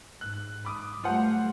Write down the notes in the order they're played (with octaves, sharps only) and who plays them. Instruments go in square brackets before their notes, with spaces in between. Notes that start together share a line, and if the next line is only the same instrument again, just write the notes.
[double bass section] G#2 [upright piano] F#6
[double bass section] G#2 [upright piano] B5 D6 D#6
[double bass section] F#3 G3 A3 [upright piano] F4 C5 F#5